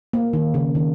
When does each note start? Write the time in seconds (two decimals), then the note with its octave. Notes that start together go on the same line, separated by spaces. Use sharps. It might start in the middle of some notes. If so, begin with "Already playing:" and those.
0.13 A#3
0.33 D#3
0.54 C#3
0.75 D#3